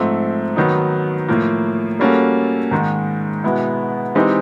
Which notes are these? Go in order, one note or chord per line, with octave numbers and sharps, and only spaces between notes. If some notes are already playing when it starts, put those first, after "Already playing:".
Already playing: G#2 F3 A3 C4
D#3 F#3 B3 D#4
A2 F3 A#3
G3 A#3 C#4 F#4 A4
G#2 D#3 G#3
B2 G#3 B3 E4
E3 G#3 C4 D#4 G4